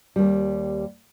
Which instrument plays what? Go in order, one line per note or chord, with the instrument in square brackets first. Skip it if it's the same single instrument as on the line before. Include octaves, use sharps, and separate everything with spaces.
[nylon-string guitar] D#2 G3